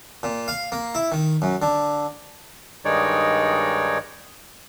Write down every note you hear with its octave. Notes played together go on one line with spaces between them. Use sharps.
A#2
F5
A#3
E4
D#3
F#2
D3
G2 D#3 G#3 D#4 C#5 D5